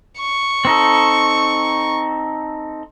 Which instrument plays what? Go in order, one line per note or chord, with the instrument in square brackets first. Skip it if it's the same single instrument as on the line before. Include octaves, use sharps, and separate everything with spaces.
[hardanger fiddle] C#6
[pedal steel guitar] C4 D#4 A4